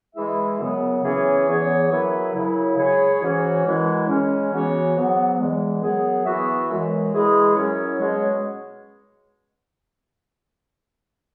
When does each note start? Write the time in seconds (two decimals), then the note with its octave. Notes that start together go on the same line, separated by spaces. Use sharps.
0.15 E3 G#3 E4 G#4 E5
0.59 F#2 C#3 F#3 B3
1.03 E3 C#4 G#4 C#5
1.47 E2 E3 B3 G#4 C#5
1.90 F#2 F#3 E4 B4 E5
2.33 F#2 C#3 F#3 E4
2.77 G#3 E4 G#4 C#5
3.21 G#2 E3 C#4 F#4 C#5
3.64 F#2 E3 G#3 E4
4.07 C#3 G#3 C#4
4.51 C#3 E3 B3 F#4 C#5
4.95 G#2 F#3 B3
5.39 E2 E3 G#3
5.81 F#2 F#3 B3 G#4
6.25 E3 B3 F#4 E5
6.69 F#2 E3 G#3
7.12 E3 G#3 E4 G#4
7.56 F#2 F#3 C#4 E4 C#5
8.00 B2 G#3 C#4 G#4 C#5